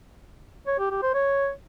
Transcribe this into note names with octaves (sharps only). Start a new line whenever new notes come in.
C#5
G4
G4
C5
C#5